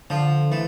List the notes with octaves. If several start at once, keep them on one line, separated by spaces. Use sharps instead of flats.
D3 F3
E3 A3